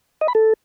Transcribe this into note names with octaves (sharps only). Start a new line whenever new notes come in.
D#5
B5
A4